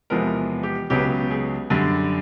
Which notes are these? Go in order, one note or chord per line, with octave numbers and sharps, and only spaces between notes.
E2 C3 F3 G#3 B3 A#4
G4
C#2 C#3 F#3 B3 G4
G#4
F#2 D3 G3